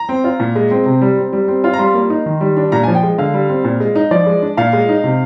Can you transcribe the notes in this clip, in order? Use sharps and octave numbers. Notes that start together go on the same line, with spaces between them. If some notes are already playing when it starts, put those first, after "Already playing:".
Already playing: A#5
C4
F4
A#2
G#3
C4
C3
G3
C4
G3
C4
F4
A#5
G3 C6
A#3
D#4
D#3
G3
D4
A#2 A#5
F3 G#5
G5
G#3
D3 F5
G3
C4
A#2
G#3
D#4
F3 D5
G#3
D4
A#2 F5
G#3
D#4
C3